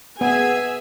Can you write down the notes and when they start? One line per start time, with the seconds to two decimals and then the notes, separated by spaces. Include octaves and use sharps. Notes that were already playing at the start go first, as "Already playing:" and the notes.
0.21 B3 G#4 E5 G#5